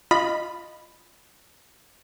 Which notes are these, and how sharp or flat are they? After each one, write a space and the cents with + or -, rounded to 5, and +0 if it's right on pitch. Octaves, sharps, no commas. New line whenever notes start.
F4 +0 D#5 -10 B5 +0